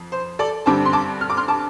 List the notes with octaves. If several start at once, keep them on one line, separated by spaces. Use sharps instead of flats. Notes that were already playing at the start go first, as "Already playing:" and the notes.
Already playing: F2
C5
A4 D5
G2 D3 G3 C4 A5 D6
C6
A5 D6
F6
D6
C6 F6
A5 D6